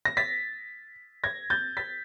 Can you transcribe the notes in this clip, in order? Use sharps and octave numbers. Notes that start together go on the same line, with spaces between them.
A#6
A6 B6
G#6 A#6
G6 A6
A6 B6